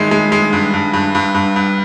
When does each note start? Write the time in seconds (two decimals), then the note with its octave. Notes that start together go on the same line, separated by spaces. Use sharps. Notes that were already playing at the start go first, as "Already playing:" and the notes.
Already playing: G2 D#3 G#3 E4
0.11 G#3
0.32 G#3
0.53 G2
0.73 G2
0.93 G2
1.15 G2
1.35 G2
1.56 G2